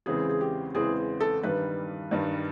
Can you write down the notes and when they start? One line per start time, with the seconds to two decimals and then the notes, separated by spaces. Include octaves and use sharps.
0.06 E2 C#3 E3 G#3 C4 G#4
0.29 G#4
0.41 G4
0.75 E2 C#3 E3 G#3 C4 G#4
1.20 A4
1.43 G2 D#3 G3 B4
2.11 G2 D#3 G3